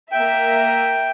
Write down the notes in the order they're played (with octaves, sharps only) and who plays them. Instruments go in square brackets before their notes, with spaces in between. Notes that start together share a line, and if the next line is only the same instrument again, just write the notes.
[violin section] A#3 E5 [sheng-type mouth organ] G5